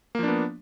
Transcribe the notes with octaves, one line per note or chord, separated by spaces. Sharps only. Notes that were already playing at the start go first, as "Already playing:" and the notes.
F3 A#3 B3 D4